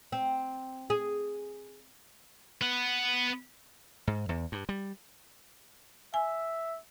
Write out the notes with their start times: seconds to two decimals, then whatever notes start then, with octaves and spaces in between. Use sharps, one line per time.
0.12 C4
0.90 G#4
2.61 B3 F#5
4.07 G#2
4.29 E2
4.52 G2
4.69 G3
6.14 E5 G#5